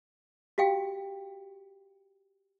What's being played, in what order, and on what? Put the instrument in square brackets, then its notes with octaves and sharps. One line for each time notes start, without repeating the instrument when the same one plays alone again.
[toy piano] F#4 G4 F5 G5